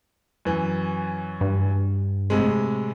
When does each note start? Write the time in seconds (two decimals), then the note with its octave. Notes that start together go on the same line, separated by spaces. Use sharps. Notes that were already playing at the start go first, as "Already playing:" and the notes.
0.45 F#2 E3
1.41 G2
2.30 A2 C3 G#3